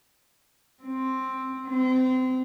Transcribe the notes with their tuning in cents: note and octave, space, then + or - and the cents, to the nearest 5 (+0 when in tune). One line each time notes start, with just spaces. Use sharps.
C4 +5
C4 -30